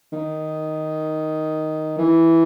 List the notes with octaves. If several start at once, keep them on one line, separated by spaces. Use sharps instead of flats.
D#3
E3